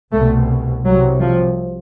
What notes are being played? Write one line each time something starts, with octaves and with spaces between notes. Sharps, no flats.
C2 B2 A3
C2 C3 F#3
F3